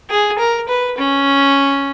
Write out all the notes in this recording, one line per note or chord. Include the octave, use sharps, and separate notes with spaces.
G#4
A#4
B4
C#4